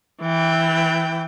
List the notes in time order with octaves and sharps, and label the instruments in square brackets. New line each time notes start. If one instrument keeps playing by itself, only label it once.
[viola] E3 G5